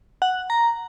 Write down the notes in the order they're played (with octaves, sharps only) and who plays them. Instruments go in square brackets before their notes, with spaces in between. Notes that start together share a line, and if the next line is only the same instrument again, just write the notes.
[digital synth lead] F#5
A#5